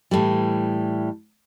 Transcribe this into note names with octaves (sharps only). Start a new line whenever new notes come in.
A2 E3 G3